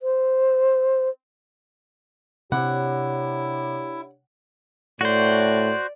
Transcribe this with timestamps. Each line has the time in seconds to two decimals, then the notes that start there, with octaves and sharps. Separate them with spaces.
0.02 C5
2.52 C3 D4 E4 G4 C#5 F#5
5.01 A2 F#4 C5 D5